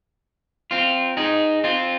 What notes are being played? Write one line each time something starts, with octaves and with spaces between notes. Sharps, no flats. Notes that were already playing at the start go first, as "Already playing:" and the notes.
C4 F4
D#4 G#4
C4 F4